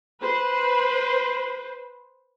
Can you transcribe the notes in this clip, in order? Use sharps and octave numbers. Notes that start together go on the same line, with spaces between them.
B4 C5